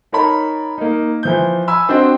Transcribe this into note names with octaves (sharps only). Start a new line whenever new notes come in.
D#4 A#4 C#5 A5 B5
A#3 D#4
E3 F3 G6
G#5 B5 E6
C4 D4 F#4 C5 D#5 G5